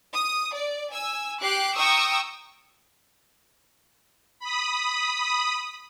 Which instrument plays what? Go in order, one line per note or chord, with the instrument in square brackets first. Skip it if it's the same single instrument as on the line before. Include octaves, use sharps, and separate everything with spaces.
[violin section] D#6
D5
G#5 E6
G4 D6 F#6 C7
G5 A#5 C#6 D#6 E6
[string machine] B5 D#6